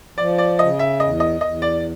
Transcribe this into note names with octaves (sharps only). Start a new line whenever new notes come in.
F3 D5
D5
C#3 D#5
E5
E2 D#5
D#5
E2 D#5
D5